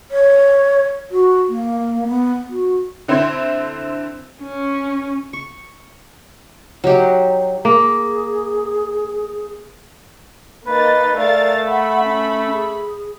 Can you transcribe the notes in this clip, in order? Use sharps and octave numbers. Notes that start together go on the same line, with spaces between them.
C#5
F#4
A#3
B3
F#4
D3 C4 E4 C5 G#6
C#4
C#6
F#3 D#4 G4
A#3 G#4
A#3 D#4 B4 A6
A3 A#4 D5 F5 A6
F#5 B5
C#4
G#4